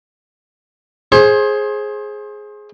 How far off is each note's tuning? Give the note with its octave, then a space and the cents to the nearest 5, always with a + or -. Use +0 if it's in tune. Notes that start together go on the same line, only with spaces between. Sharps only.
G#4 +10 C5 +30 C6 +35